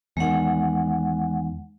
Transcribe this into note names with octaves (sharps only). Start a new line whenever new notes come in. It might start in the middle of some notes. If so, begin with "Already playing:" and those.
E2 D#3 G#3 F#5